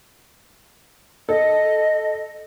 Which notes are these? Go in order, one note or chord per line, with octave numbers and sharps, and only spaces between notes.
A4 D#5